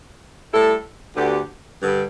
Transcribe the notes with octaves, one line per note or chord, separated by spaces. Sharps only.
A2 G3 E4 A4
D2 D3 B3 G4
G2 D3 G3